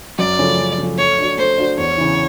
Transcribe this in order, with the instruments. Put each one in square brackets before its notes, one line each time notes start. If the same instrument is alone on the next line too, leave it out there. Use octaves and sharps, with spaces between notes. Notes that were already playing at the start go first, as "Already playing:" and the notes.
[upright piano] F#2 [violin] D5
[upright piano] C#3 F3 A3 C#4
F#2
C#3 F3 A3 C#4
[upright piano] A3 [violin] C#5
[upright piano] D4 F#4
[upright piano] A3 [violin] C5
[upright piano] D4 F#4
[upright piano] E2 [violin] C#5
[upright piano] C#3 E3